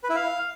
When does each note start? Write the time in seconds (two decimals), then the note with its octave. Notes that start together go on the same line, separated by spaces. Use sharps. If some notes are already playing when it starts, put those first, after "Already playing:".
0.04 B4
0.10 E4
0.16 F5